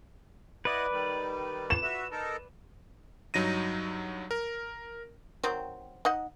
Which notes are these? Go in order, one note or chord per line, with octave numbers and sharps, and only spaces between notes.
E4 B4 D5 D#5 F#5
D#3 G3
E7
F#4 E5
D#4 A4 A#4
G2 F#3 D#4 A#6 D#7
A#4
D#3 F#3 C4
D#4 D#5 F#5